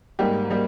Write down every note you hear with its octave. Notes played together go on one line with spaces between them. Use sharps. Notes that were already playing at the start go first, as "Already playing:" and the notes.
G#2 G3 A#3 G4
G3 A#3